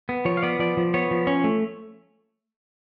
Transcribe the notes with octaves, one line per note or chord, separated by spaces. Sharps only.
B3
F3 C#5
F5
B3 D5
F3 D5
F3
B3 C#5
F3
C#4 C#5
A3